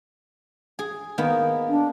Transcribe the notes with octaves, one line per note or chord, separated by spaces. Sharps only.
G#4
D#3 A#3 B3
D4